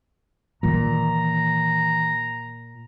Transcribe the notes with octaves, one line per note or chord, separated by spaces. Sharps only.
A#2 D#3 E3 A#5